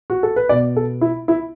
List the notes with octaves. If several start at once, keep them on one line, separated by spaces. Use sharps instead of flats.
F#4
A4
B4
B2 B3 D5
A4
E4
E4